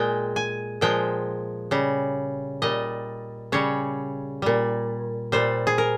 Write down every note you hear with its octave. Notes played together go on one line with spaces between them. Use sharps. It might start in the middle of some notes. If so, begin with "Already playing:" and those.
Already playing: A#2 G#3 G5
G#5
A#2 F3 G#3 G5
C#3 G3
A#2 G3 D#5
C#3 G3 C#5
A#2 G3
A#2 G3 C5
G#4
A#4